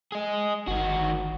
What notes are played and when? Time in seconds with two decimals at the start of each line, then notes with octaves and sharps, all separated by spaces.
0.12 G#4 D#5
0.68 G1 D#3 F#4